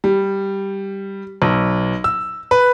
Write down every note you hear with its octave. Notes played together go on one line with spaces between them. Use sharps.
G3
B1
E6
B4